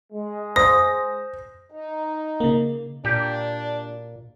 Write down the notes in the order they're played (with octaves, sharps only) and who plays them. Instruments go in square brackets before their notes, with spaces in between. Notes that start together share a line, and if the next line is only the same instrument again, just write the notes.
[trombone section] G#3
[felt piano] C5 [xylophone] D#6 [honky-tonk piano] A#6
[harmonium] D#4
[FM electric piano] C#3 A#3
[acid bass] A#2 [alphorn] D4 [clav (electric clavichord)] G4